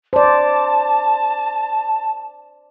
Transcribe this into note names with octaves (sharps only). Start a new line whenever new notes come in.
C5 D5 A5